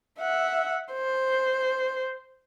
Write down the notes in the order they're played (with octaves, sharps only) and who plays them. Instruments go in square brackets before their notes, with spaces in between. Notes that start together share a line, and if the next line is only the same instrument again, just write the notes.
[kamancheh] E5 F#5
C5